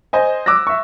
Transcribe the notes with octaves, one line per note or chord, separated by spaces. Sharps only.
C5 D#5 G#5
D6 E6 F#6 A#6
E5 C#6